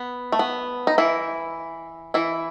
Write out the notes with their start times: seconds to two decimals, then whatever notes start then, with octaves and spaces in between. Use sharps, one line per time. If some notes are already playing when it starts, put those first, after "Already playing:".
Already playing: B3
0.32 A3
0.39 B3
0.87 D#4
0.98 E3 E4
2.14 E3 E4